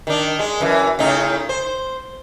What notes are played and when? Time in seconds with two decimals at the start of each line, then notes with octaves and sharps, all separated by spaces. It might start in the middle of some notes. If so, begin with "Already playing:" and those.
0.07 D#3 D4
0.39 G#3
0.61 F#2 E3
0.99 A2 C#3 D#4
1.49 C5